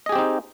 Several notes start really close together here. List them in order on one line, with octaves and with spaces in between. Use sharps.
D#5 G#4 G4 C4 D#4